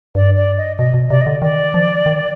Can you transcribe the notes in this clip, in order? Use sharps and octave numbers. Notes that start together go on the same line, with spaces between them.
G2 D5
D5
D#5
B2 D#5
B2
C3 D5
D#5
D3
D#3 D5
F3
D#3